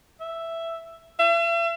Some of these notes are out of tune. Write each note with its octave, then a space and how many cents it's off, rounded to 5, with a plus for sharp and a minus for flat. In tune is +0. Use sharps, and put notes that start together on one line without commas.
E5 +5
E5 +40